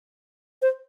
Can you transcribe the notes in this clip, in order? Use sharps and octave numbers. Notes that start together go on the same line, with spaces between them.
C5